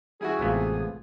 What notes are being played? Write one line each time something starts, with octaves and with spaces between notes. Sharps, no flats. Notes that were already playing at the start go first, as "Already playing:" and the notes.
G3 E4 F#4 G#4
A1 C3 G#3 A3 B3 F4